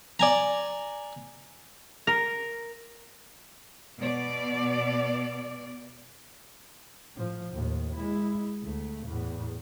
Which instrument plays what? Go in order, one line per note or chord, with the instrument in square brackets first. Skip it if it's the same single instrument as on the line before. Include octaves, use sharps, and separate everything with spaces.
[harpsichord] D5 G#5 A#5
[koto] A#4
[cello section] B2 B3 D5
[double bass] A2 F3
D#2 A2
G#3 E4
D2 A3
E2 A2